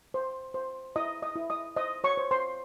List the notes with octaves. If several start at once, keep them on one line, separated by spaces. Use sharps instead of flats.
C5
C5
E4 D#5 D#6
D#5 D#6
E4
D#5 D#6
C5 D#5 D#6
C#5 C#6
C5
C5 C6